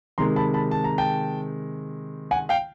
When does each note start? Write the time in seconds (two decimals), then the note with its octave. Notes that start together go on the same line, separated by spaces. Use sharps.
0.18 C3 D#3 G#3 A#5 C6
0.36 A5 B5
0.54 A5 B5
0.71 A5
0.84 A#5
0.98 G5 A5
2.31 F#5 G#5
2.49 F5 G5